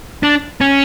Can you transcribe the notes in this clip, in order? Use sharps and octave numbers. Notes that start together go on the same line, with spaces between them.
D4
C#4